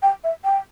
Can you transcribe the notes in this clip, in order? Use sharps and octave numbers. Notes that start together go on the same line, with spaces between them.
G5
E5
G5